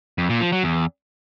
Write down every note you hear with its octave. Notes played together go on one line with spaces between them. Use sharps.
F2
A#2
F3
F#3
E2